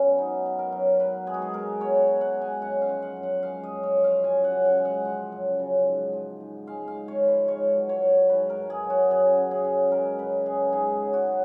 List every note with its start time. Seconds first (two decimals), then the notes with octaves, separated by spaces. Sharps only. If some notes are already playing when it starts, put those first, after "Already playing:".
Already playing: F#3 B3 C#4
0.18 B2 D#4
0.46 B2
0.59 A#4
0.72 F#3
1.00 B2 B4
1.27 G#3 G#4
1.34 F#4
1.42 G#4
1.54 G#3 A#4
1.80 B2 C#5
2.08 B2
2.21 F#5
2.34 G#3
2.42 G#5
2.62 F#2 F#5
2.82 F5
2.89 F3
3.02 F#5
3.16 F#2
3.23 F#5
3.43 G#3 F5
3.63 D#5
3.70 F#2
3.83 C#5
3.97 F3
4.04 F5
4.24 F#2 G#5
4.44 F#5
4.51 C#3
4.65 G#5
4.78 G#3
4.85 F#5
5.05 F3
5.32 F#2
5.59 C#3
5.87 G#2
6.13 F3
6.40 G#2
6.67 G#3 F5
6.88 F5
6.95 G#2
7.08 C#5
7.21 F3
7.28 B4
7.48 G#2 C#5
7.75 F#3
7.89 C#5
8.02 F#3
8.29 G#2 B4
8.50 A#4
8.57 G#2
8.70 G#4
8.84 F#3
8.90 F#4
9.10 F#2 G#4
9.38 C#3
9.51 G#4
9.65 F#2
9.92 G#3 A#4
10.19 F#2 B4
10.46 C#3 G#4
10.73 G#2 G#4
11.00 F#3
11.13 F#4
11.27 F#3